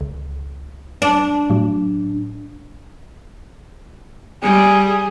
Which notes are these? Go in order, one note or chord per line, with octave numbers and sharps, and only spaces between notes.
C#2
D4
A2 F#3
G3 G#4